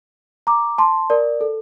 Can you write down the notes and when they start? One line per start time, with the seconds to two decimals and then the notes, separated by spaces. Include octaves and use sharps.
0.47 A#5 D6
0.78 A5 C6
1.10 A#4 D5
1.41 A4